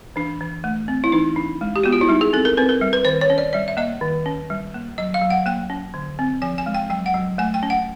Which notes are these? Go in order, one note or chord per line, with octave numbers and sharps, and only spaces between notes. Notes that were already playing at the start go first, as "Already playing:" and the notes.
E3 D4
E3
A3
C4
E4
E3 D#4
D4
G#3
G4
B3 F#4
F4
E4
G3 D#4
G#4
C4 A4
A#4
C4 B4
A#4
G3
B4
D#3 C5
C#5
C#4
D5
G3 D5
E5
A#3 D#5
D#3
C#4
G3
A#3
F#3 D#5
F5
F#3
F#5
A#3 G5
C#4
D3
C4
F3 G#5
G#5
G#3
G5
F#3 G5
F#5
F#3
A3 G#5
G5
C#4
F#5